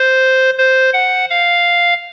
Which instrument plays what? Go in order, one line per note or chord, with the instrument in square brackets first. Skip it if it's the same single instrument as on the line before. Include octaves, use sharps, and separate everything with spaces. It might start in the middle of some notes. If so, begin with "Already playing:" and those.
Already playing: [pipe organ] C5
C5
F#5
F5